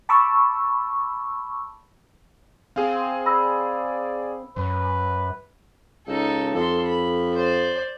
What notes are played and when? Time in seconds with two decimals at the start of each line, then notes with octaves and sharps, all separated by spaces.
0.09 A5 B5 C#6 D6 E6
2.76 C4 G#4 F5
3.26 D5 B5 E6 A#6
4.56 F#2 B4
6.07 C#2 D#4 A4
6.54 F2 A4 C6
6.85 B5
7.34 C5 D5